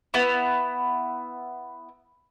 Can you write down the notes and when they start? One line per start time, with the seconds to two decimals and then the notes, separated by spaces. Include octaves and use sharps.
0.14 B3 E4